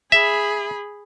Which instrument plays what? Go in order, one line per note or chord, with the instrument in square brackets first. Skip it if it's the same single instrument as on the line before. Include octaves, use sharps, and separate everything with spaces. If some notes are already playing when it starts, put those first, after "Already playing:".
[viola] G#4 B5 [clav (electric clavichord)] E5